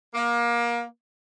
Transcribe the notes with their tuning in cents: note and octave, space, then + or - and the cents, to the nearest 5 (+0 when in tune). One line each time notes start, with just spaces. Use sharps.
A#3 +25